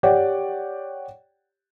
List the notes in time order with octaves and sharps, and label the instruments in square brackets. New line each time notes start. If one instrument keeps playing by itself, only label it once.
[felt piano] G4 C#5 D5 F#5 G5